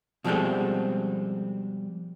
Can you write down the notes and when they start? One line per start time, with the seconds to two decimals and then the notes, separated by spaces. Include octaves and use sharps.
0.24 B2 F3 G3 G#3 C4 A4